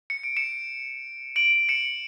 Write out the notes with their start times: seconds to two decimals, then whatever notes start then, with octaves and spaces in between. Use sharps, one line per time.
0.10 C#7
0.24 D7
0.37 C#7 E7
1.36 D7 F#7
1.69 C#7 E7